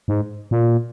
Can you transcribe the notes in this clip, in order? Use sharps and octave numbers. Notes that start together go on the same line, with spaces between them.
G#2
A#2